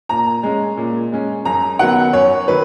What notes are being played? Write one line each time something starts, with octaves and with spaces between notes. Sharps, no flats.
A#2 A#5
G#3 C#4
A#2
G#3 C#4
F#2 A#5
D#3 F#3 B3 F#5
F#2 C#5
D#3 F#3 B4